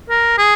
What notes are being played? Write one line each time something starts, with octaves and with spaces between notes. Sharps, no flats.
A#4
G#4